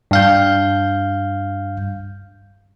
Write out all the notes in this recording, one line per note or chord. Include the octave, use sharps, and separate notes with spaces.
G2 F5 G6